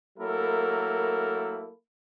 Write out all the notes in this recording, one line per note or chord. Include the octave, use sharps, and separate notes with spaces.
F#3 A3 A#3 E4 A4 A#4